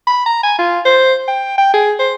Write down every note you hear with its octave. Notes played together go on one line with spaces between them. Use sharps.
B5
A#5
G#5
F4
C5
G5
G5
G#4
C5